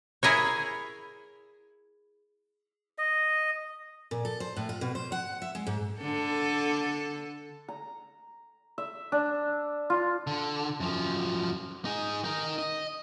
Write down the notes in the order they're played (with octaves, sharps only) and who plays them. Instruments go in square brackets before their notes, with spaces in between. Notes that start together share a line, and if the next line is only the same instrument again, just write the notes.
[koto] E4 G#4 A#4 C#5
[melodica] D#5
[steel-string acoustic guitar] A#2
A4
C5
A2
F4
B2
C5
F#5
E5
G#3
G#2
[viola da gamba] D3 A4
[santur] A#5
E5
D4
F4
[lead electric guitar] D3
F#2 F3
D#4 G#4
D#4 A#4
D#5